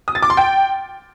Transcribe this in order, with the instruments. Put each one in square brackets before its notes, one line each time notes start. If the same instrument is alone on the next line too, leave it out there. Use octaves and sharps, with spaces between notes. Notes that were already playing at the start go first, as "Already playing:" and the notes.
[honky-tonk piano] D#6
A6
D6
C6
G5